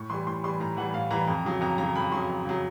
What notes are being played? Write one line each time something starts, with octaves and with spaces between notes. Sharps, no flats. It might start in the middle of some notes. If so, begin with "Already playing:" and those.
Already playing: A2 C#6
E3 G3 C6
A2 C6
E3 G3 C6
A2 A#5
E3 G3 F#5
A2 F5
E3 G3 A#5
F2
C#3 F#3
F2 A#5
C#3 F#3 A#5
F2 B5
C#3 F#3 C6
F2
C#3 F#3